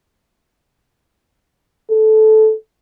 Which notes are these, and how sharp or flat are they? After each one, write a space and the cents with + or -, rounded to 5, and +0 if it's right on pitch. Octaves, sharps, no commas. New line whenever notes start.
A4 -15